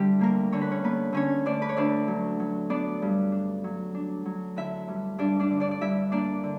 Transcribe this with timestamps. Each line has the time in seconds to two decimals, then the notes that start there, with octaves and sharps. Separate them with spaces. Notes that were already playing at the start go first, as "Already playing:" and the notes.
Already playing: D3 G3 E4 G4
0.19 D2 A#3 A#4
0.52 D3 C#5
0.61 B4
0.71 C#4 C#5
0.84 A#3 B3 B4
1.13 D3 C#4 C#5
1.45 D2 D4 D5
1.62 B4
1.69 C#5
1.77 D2 D4 D5
2.08 F#3
2.40 F#3
2.70 B3 D4 D5
3.02 G2
3.32 D4
3.64 F#3
3.95 D4
4.26 F#3
4.56 D3 E4 E5
4.88 G2
5.18 G2 D4 D5
5.40 D4 D5
5.50 D3
5.60 D4 D5
5.71 D5
5.81 G2 E4 E5
6.12 A#3 D4 D5
6.43 D3